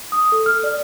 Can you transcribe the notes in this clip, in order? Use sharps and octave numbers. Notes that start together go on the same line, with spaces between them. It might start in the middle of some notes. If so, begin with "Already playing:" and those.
D#6
A4
F6
D5